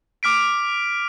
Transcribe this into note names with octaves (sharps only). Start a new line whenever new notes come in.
D6 F6 B6 D7